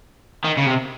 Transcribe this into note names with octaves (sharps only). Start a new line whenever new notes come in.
D#3
C#3
C3